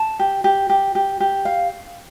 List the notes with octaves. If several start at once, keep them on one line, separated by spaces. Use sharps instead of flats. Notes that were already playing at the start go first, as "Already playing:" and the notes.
Already playing: A5
G4
G4
G4
G4
G4
F5